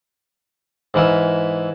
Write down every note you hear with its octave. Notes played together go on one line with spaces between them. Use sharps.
G#2 E3 A#4 E5